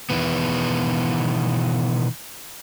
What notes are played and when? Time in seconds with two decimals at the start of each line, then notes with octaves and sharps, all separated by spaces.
0.10 B2 D#3 E3 B3